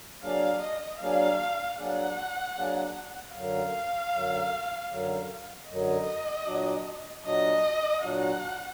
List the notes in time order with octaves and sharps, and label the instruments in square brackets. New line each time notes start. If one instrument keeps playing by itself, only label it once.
[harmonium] F#3 A#3 D4 G#4 D5 [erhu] F5
[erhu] D#5
[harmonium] F#3 A#3 D4 G#4 D5 [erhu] F5
[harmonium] F#3 A#3 D4 G#4 D5 [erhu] F#5
[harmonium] F#3 A#3 D4 G#4 D5
[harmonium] F#2 D3 F#3 [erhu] F5
[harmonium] F#2 D3 F#3
F#2 D3 F#3
[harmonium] F#2 D3 F#3 [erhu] D#5
[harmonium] A#2 F#3 D4 F#4
[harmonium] A#2 F#3 D4 F#4 [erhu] D#5
[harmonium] A#2 F#3 D4 F#4 [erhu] F#5